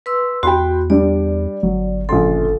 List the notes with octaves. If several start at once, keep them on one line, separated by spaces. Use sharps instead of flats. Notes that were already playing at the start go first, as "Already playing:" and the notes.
B4 C6 E6
E2 F#4 G5 B5 C6
G3 D4 D5
G1 F#3
A#1 C#3 A4 C6